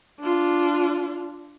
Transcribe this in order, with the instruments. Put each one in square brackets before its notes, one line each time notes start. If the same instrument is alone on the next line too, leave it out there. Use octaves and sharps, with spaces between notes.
[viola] D4 F4